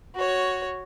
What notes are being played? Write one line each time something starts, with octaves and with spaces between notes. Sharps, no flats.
F#4 C#5